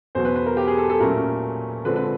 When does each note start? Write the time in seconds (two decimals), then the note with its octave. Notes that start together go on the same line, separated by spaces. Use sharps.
0.15 E2 B2 F#3 B3 C5
0.25 B4
0.36 B4
0.46 A#4
0.57 G4
0.68 G#4
0.78 A4
0.90 A4
1.00 A#2 F#3 A3 C#4 A#4
1.85 D3 F3 G#3 C4 B4
1.96 B4